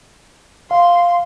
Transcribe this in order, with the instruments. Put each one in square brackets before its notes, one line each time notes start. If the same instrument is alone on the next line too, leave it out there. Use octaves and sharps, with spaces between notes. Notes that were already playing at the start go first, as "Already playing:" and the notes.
[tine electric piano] F5 [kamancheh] C6